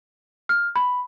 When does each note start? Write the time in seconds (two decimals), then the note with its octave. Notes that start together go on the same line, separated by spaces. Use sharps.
0.49 F6
0.76 B5